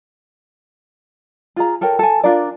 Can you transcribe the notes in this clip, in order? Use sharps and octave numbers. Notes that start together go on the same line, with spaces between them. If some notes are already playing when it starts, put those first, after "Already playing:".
F4 G#4 A#5
A4 A#4 C#5 G5
A4 G#5
D4 F4 A#4 D5